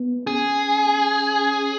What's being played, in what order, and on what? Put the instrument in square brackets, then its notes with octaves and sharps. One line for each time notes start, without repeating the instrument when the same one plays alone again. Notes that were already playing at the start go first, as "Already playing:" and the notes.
Already playing: [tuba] B3
[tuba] C#4 [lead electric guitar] G#4